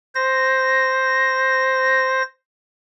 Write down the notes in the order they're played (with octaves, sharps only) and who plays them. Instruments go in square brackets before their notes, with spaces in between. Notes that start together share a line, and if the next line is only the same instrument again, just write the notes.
[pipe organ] C5 A#6